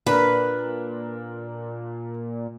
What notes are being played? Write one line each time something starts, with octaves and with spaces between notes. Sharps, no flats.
A#2 D4 A#4 B4